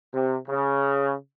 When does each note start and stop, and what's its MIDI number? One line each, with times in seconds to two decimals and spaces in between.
0.13 0.37 48
0.48 1.13 49